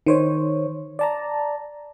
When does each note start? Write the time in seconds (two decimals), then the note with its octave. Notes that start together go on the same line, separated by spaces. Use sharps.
0.07 D#3 C5 C#5
0.99 D5 A5 A#5